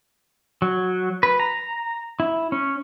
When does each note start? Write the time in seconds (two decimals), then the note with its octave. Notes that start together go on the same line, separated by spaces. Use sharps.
0.62 F#3
1.23 B4
1.40 A#5
2.20 E4
2.52 C#4